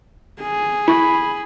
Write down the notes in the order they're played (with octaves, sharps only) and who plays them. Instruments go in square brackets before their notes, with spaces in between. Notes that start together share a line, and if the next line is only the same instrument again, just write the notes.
[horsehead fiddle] G#4
[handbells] E4 C#6 [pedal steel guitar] B5